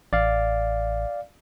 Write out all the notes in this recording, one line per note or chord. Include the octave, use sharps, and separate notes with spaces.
A1 D5 F5